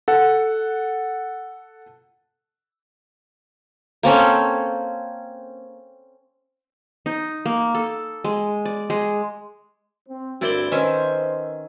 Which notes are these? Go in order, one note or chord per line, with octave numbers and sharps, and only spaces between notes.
A4 F#5
A#3 C4 C#4 A4
D#4
A#3
A4
G#3
D5
G#3
C4
D2 G2 C4 E4 F#4 A#4 D5 G7
D#3 C#4 B4 C5 D#5 E5